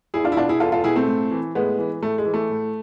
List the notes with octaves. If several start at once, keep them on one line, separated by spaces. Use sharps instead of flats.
E2 E4 G#4
D4 F4
E4
B2 D4 F4
E4 G#4
E2 F4 A4
F4 A4
B2 E4 G#4
A3 C4
A2
E3
A2 G#3 B3
E3
A2 A3
G#3
E3
A3
A2